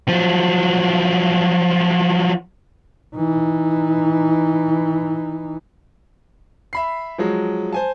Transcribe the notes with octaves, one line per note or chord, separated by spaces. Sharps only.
F3 F#3
E3 D#4
E5 B5 C7
F3 F#3 G#3
C5 G#5 A5